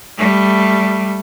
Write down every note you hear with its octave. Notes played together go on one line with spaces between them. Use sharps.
G3 A3